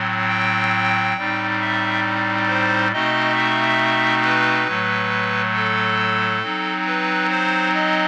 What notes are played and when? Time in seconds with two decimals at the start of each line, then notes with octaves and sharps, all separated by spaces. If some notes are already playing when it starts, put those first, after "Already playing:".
Already playing: A2 F#3 C4
0.29 G5
1.17 A2 G3 C4 D#4
1.61 E5
2.48 C5
2.92 B2 A3 C4 D#4 D#5
3.35 E5
4.24 B4
4.67 A2 F#3 A3
5.54 A4
6.43 F#3 C4 D#4
6.87 B4
7.30 C5
7.74 D#5